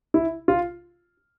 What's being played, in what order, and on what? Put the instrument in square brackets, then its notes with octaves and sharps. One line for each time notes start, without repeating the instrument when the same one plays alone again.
[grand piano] E4
F4